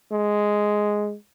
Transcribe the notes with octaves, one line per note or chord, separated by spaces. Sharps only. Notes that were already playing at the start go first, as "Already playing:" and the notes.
G#3